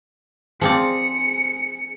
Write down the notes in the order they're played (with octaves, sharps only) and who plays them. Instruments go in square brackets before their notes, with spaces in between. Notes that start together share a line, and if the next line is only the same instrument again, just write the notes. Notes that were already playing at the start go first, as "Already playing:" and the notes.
[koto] F3 C4 D5 [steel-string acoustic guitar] G#4 [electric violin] C#7